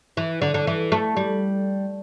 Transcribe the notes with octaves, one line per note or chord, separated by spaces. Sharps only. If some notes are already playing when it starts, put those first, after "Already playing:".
E3
D3
D3
E3
A3
G3